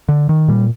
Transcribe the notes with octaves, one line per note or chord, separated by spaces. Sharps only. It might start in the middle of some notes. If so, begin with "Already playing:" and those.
D3
D#3
A#2 G3